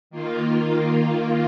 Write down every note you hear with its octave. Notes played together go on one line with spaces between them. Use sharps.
D#3 A#3 F4